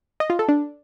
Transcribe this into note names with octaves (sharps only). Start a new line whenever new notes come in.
D#5
F4
A4
D4